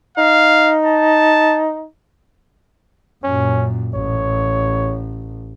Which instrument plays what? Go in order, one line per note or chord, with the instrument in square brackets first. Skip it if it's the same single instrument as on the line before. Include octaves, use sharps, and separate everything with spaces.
[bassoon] D#4 [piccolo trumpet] F5
[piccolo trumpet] A5
[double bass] F#2 A#2 [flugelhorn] C#4
[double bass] A1 [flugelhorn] C#5